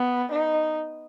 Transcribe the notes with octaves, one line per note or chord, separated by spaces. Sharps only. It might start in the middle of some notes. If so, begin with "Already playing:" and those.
Already playing: B3
D#4